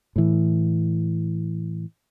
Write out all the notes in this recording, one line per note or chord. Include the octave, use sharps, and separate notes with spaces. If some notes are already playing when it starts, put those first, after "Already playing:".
A2 E3